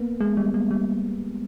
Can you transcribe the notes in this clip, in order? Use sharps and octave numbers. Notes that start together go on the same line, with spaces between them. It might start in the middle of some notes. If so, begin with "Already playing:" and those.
Already playing: A#3 B3
G#3
G3
G#3
G3